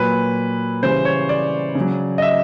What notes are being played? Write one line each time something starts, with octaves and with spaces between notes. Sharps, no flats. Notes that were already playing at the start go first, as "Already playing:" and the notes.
Already playing: A#2 F#3 B4
C#3 E3 G3 C5
C#5
D5
C#3
F#3
D#5
E5